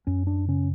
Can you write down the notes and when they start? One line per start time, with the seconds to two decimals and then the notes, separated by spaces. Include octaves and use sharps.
0.07 F#2 C#4
0.27 D4
0.48 C#3 C#4